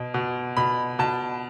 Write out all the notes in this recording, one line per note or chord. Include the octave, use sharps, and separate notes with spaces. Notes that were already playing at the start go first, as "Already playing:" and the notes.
Already playing: B2
B2
B2 B5
B2 A5